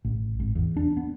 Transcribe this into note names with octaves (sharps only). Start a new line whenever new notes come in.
A1
G#1
E2
D4
B3